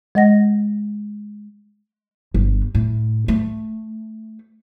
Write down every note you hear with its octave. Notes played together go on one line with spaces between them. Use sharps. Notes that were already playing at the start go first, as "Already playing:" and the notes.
G#3 D#5 F#5 A#6
G1
A2
A3